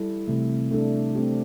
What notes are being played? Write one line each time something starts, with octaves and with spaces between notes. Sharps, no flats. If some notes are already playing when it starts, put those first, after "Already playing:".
Already playing: G3 E4 A4
C3 E3 A3
A3 D4 A4
A3 C4 G4